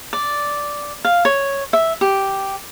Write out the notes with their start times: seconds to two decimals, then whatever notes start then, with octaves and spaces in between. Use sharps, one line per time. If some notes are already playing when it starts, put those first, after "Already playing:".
0.13 D5
1.05 F5
1.25 C#5
1.73 E5
2.01 G4